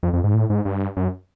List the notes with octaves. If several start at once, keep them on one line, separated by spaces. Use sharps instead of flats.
F2
F2
G#2
A2
G#2
G2
F#2